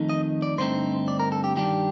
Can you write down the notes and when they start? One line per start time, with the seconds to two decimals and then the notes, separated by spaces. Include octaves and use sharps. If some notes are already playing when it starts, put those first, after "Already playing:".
Already playing: F2 D#3 A3 D#4
0.09 D#5
0.42 D5
0.58 G2 D3 A3 C4 D#4 C5
1.08 D5
1.20 A#4
1.32 A4
1.44 G4
1.56 G2 D#3 G3 D4 G4